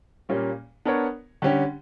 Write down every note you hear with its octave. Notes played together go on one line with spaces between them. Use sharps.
A#2 G3 A#3 C#4
B3 D4 A#4 C#5
D3 G3 C#4 G4